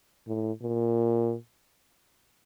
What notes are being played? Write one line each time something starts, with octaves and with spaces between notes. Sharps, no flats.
A2
A#2